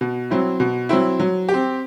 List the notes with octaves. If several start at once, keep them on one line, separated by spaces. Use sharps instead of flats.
B2
F#3 C4 E4
B2
F#3 C4 E4
F#3
G4
C4